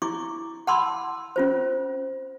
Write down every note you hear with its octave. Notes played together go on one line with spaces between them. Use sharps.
E4 C#6 D6
F#5 A5 B5 C6 D6 E6
C#4 F4 C5